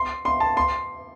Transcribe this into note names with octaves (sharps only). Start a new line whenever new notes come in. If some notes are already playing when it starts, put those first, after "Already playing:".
Already playing: C6
C6
A5
C6